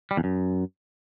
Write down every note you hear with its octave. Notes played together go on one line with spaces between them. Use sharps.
G3
E2
F#2